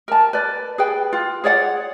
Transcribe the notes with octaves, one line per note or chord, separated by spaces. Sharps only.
A#4 A5
B4 D5
G#4 B4 G5
F4
G#4 C#5 D5 F#5